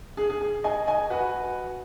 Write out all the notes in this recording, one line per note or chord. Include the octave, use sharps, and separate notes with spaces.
G#4
G#4
G#4
D#5 G#5
D#5 G#5
F#4 B4